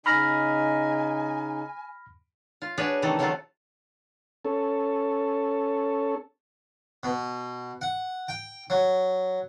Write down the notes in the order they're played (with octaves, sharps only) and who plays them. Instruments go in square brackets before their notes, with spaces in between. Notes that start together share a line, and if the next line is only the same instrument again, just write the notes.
[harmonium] C#3 D#4 D#5 [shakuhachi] G#5 [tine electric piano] B5 F6 A#6
[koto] F4
D4 F#4 G#4 B4 C#5
C3 D#3 E3 A3 A4
C#3 F#3 A3 F4 F#4 A4
[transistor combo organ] C#4 A4
[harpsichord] B2
F#5
G5
F#3